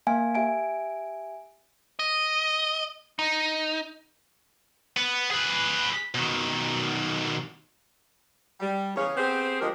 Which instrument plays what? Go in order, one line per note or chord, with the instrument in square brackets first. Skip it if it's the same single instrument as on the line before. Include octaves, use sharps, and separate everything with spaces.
[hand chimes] A#3 F5 G#5
G4 E5 G#5 D7
[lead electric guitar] D#5
D#4
[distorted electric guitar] B3
G#4 B4
B2 D#3
[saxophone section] G3
E2 C#3 C#4 G#4 C#5 F5
B3 C4 G4 G#4 C5
D2 F3 G#3 G4 A#4 D#5